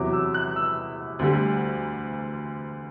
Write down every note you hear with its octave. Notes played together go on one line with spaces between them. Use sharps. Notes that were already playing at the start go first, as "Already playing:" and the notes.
Already playing: E2 C3 F#3 D6
E6
F#6
E6
D2 D3 G3